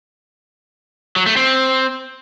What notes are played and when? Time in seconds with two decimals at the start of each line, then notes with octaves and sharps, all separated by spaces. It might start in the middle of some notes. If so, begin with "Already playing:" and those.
1.16 F#3
1.26 A3
1.37 C4